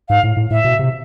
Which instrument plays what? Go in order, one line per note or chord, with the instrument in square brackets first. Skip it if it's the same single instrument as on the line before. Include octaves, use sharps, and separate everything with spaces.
[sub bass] G#2 [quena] F5
[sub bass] A2
A2
[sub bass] A2 [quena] E5
[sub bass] B2
C3